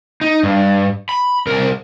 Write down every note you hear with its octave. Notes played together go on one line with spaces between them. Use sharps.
D#4
G2
B5
C2 A#4